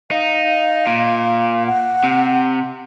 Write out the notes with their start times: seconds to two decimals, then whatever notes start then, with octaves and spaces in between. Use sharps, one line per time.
0.11 D#4 F5
0.87 A#2
1.67 F#5
2.04 C3